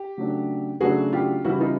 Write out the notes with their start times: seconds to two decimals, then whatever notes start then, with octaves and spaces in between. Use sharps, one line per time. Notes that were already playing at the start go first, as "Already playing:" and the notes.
Already playing: G4
0.17 C#3 F#3 A3 D4
0.80 C#3 F#3 A3 D4 F#4 G#4
1.13 F4 G4
1.45 C#3 E3 G3 E4 F#4
1.60 D#4 F4